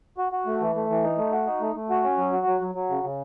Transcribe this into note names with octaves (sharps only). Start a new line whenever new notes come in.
F#4
F#4
A3
E3
A3
E3
D#4
A3
F#4
D#4
A3
A3
F#4
C#4
F#3
F#4
F#3
F#3
F#3
C#3
C#3